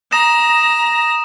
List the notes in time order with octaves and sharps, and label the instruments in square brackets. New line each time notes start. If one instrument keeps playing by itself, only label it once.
[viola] A#5 [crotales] D#6 A#6 E7